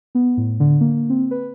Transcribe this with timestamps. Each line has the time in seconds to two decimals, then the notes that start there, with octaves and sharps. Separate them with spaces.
0.15 B3
0.37 A2
0.60 D3
0.81 A#3
1.10 C4
1.31 B4